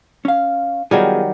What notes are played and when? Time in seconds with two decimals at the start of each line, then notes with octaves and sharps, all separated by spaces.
0.25 C#4 F5
0.91 D#3 F#3 G3 B3 F4 G#4